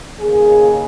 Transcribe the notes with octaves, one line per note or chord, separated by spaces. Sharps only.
D#2 C#3 A#3 G#4